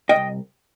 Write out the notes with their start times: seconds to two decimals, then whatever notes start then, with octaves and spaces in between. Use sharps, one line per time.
0.09 D#5 G5
0.16 C2